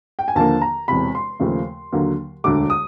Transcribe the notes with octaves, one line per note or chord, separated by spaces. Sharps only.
G5
G#5
D#2 D3 F3 A#3 A5
A#5
E1 E2 C3 B5
C6
D#2 C#3 F3 A3
D#2 D3 F#3 A#3
E1 D2 D3 D6
D#6